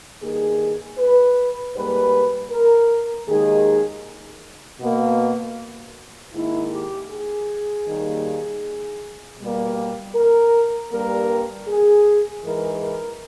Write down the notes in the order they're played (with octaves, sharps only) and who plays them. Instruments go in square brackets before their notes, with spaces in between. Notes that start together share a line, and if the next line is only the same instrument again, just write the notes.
[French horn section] G2 D#3 A#3 G#4
B4
G#2 G3 A#3 B4
A#4
D#2 D#3 G#3 G#4
B2 A#3
G#2 D#3 A#3 E4
G4
G#4
D#2 D#3 G3 A#3
B2 G3 A#3
A#4
G2 G3 A#3 A#4
G#4
G#2 E3 G#3 A#4
A#4